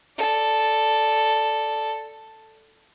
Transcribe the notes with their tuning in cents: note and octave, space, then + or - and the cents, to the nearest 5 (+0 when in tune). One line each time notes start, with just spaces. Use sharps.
A4 +0 D5 +0